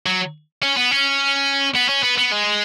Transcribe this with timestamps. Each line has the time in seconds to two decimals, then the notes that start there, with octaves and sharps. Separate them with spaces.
0.06 F#3
0.63 C#4
0.77 B3
0.91 C#4
1.75 B3
1.89 C#4
2.04 B3
2.18 B3
2.32 G#3